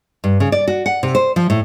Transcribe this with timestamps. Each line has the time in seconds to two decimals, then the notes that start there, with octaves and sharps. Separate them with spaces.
0.24 G2
0.40 C#3
0.52 D5
0.68 F#4
0.86 F#5
1.03 C3
1.15 C5
1.36 F3
1.50 A2